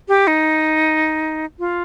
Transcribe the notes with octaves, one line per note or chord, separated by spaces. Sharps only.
G4
D#4
F4